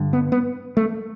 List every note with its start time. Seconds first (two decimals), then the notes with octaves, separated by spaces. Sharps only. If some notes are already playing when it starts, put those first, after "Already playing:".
Already playing: G2 D3
0.13 B3
0.32 B3
0.77 A3